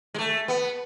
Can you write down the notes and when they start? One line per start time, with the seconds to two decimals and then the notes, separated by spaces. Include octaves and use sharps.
0.14 G#3
0.18 A3
0.48 B3